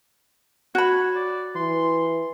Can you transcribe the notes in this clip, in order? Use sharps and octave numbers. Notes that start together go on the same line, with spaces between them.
F#4 C#5 B5
D5
E3 C6